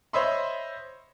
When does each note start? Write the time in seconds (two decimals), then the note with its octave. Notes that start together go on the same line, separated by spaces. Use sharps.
0.13 C5 C#5 D#5 E5 B5 C6